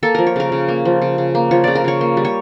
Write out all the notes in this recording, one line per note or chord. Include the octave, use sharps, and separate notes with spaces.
A#3 A4
F3 A#4
C#5
C#3 A#4
C#3
A#3
F3
C#3
C#3
A#3
F3 C#5
C#3 D5
A#4
C#3 C#5
A#3
G3
C#5